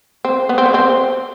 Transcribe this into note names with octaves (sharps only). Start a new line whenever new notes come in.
C4
B3
C4
B3
C4